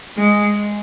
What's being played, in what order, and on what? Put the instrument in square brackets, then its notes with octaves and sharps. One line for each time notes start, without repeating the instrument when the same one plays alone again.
[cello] G#3